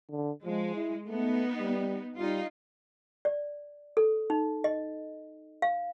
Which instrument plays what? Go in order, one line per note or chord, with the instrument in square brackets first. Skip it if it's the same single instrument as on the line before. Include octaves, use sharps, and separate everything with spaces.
[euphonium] D3
[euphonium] F3 [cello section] G#3
[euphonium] E4
[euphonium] A3 [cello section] B3 D#4
[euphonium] G3
[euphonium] G3 [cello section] D#4 F4
[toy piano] D5
A4
D#4
D#5
F5